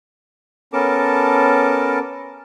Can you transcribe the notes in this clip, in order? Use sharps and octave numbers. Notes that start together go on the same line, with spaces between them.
B3 C#4 A4 A#4 A5 D6